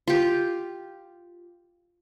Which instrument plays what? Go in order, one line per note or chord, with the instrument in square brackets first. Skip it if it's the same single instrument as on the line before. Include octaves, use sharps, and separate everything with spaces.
[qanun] F4 G4